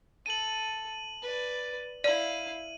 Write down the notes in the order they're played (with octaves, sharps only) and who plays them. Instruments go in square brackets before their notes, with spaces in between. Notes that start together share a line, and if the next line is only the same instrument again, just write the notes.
[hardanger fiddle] A4 [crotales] D#7 F#7
[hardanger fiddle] B4 D5
[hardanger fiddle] E4 F5 [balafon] D5 [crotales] D#7 F#7